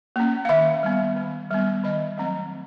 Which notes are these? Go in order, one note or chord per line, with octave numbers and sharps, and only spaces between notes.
A#3 C#4
F5
D#3 E5
G3 B3
D#3
G3 B3
D#3 D#5
F#3 A3 C4